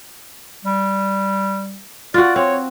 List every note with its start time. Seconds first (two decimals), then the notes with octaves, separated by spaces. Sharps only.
0.65 G3
2.14 F4 F#4 D5
2.36 C4 C#5